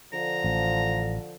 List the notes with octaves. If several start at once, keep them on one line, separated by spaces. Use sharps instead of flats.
D3 F3 A#5
A1